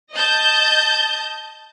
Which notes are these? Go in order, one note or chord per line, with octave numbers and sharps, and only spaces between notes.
D#5 A5 G6